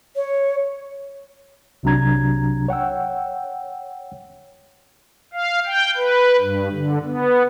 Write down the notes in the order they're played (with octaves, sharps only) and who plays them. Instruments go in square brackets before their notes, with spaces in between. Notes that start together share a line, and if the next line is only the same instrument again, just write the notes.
[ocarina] C#5
[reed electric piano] C2 C3 F#3 D4 A#5 G#6
C#5 F#5 G5 E6
[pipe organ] F5
G5
B4
G2
D3
B3